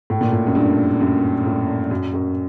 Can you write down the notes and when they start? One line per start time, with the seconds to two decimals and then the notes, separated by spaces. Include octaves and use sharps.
0.10 A2
0.21 A#2
0.32 A2
0.47 F#2
0.55 G2
1.01 F#2
1.46 A2
1.91 F#2
2.14 F#2